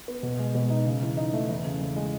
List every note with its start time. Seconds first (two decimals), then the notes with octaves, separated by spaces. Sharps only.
0.08 B3
0.23 B2
0.39 G#3
0.55 B2
0.70 D#4
0.86 C#3
1.02 E3
1.17 D#4
1.33 A3
1.49 E2
1.64 C#3
1.81 E2
1.96 G#3